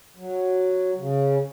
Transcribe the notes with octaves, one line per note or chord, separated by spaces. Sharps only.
F#3
C#3